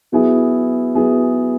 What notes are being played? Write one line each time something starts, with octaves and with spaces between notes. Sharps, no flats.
F#3 B3 E4 G#4
F#3 B3 E4 G#4